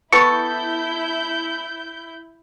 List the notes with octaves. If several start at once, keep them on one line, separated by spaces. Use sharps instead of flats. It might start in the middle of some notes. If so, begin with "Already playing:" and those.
B3 E4 A4 C#6 G6